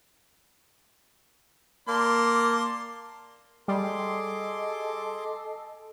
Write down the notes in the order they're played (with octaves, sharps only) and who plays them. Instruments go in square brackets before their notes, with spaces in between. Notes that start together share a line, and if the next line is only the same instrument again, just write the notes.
[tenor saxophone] A#3 [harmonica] D5 A5 C6
[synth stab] G3 [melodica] G#4 C6 D6 [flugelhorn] A4 [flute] D#5